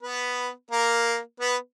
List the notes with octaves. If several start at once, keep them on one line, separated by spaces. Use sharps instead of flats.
B3 B4
A#3 A#4
B3 B4